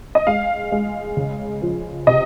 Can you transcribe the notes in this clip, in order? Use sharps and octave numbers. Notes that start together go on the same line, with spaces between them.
D#5
G#3 F5
G#3
C#3
F3
C3 D#5